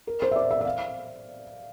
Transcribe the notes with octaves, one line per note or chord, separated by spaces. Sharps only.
A#4
C5
E5
D5
E5
E5
F5